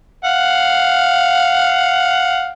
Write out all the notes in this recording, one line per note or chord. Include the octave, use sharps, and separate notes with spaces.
F5 F#5